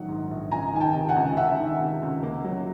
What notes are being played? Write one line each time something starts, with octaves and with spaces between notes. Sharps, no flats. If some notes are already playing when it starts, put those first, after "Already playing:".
Already playing: A#1 D#3 F#3 F#5
G#2
A#1
C#2 G#5 A#5
D#3 G#5
G5 A5
C3
F#5 G#5
C#2
C#2 E5 F#5
D#3
C3
C#2
A#3
F#3